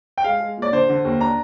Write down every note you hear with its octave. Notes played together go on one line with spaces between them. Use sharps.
G5
G#3 F5
G#3
A#2 D5
D3 C5
D3
D#2
D4 A#5